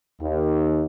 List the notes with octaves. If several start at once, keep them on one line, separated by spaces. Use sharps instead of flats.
D#2